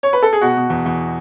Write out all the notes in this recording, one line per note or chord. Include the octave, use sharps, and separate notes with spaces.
C#5
B4
A4
G#4
B2 F#4
B2
E2
E2